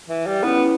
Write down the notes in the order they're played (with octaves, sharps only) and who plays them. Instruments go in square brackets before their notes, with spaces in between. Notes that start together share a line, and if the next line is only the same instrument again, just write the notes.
[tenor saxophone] E3
G3
[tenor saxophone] B3 [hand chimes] C#4 E4 B4